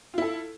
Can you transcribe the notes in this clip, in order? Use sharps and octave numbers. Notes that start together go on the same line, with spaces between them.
E4 F4 A4